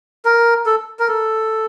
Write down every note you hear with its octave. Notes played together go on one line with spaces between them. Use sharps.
A#4
A4
A#4
A4